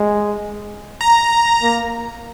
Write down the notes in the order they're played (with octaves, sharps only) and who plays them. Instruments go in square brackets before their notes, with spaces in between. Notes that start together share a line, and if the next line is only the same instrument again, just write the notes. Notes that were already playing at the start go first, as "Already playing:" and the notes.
Already playing: [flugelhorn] G#3
[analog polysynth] A#5
[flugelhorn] A#3